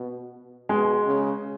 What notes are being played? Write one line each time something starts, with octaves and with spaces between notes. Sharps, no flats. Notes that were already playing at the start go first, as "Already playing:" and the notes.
Already playing: B2
B2 G#3
C#3